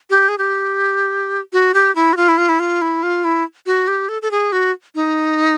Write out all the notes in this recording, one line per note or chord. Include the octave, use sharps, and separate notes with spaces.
G4
G#4
G4
F#4
G4
E4
F#4
F4
E4
F4
E4
F4
E4
F4
E4
F#4
G4
A4
A4
G#4
F#4
D#4